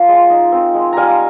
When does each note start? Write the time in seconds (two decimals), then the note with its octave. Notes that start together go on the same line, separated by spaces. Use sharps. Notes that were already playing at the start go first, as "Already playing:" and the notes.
Already playing: F3 A#3 F4
0.08 G#3
0.30 D#4
0.52 C4
0.74 G#3
0.93 G3 F5 G#5 A#5